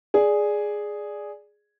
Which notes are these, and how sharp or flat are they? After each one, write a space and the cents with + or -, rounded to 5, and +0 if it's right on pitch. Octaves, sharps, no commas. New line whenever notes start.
G#4 +0 D5 +0